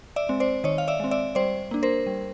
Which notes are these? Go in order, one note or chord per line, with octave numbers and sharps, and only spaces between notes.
D5 E5
G#3 C4
C5 D5
D#3 C#5 D#5
F5
D5 E5
G#3 C4
D5 E5
G3 C5 D5
A#3 D4
A#4 C5
G3